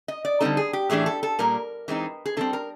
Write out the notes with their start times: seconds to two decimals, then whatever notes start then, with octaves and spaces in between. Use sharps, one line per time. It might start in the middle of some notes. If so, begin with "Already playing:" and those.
0.08 D#5
0.25 D5
0.40 D3 G3 C4 D#4 A4
0.57 G#4
0.73 G4
0.90 A2 E3 A3 D4 G#4
1.06 A4
1.23 A4
1.39 A#2 G3 A#3 A#4
1.88 E3 G#3 C4 D#4
2.25 G#4
2.37 D3 G3 C4 A4
2.53 A#4